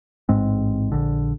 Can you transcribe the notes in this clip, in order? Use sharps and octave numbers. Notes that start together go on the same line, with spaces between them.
A1 G#2 G#3 C4
A#1 D3